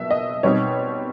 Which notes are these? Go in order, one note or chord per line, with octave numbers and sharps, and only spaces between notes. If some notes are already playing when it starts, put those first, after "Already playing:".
Already playing: B2 F#3 A#3 E5
D#5
B2 G3 C4 D#4 C#5